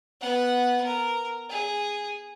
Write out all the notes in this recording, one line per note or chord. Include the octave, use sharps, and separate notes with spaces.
B3 F#5
A#4
G#4